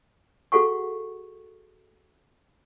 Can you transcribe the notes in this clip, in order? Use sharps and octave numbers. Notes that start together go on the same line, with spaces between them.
F#4 G#4 A4 F5 F#5 C#6